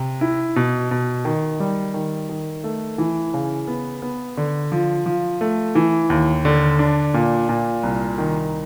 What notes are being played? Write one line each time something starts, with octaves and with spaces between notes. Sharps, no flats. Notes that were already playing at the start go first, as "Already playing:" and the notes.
Already playing: C3
E4
B2
B2
D#3
G3
D#3
D#3
A3
E3
C#3
B3
B3
D3
F3
F3
A3
E3
D#2
D3
D4
A#2
A#2
C2
D#3